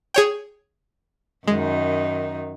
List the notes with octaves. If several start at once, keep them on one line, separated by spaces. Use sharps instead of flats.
G#4 C#5 G5
F#2 D#3 G#3 D#4